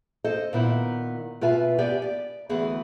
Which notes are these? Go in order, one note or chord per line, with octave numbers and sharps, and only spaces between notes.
A4 C5 D#5
A#2 D#3 B3 E4
B2 F4 B4 E5 G#5
B3 G4 D5 G#5
D5
D2 E3 B3 F#4 G#4